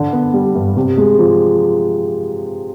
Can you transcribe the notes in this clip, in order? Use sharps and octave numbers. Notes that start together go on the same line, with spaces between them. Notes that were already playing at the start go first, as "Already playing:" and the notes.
Already playing: D3
B3
G3
G2
C3
G#3
F3